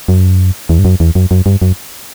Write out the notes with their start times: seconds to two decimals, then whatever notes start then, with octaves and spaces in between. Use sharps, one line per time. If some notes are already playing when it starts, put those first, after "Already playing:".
0.08 F#2
0.69 E2
0.79 G2
0.85 F#2
1.00 E2
1.15 F#2
1.31 F#2
1.46 G2
1.62 F#2